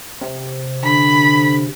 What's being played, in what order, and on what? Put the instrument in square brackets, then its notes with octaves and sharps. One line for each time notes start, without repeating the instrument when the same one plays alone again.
[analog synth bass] C3
[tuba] D3 [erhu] B5